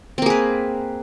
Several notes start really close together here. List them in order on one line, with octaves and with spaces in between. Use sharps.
C4 A#3 G#4 B4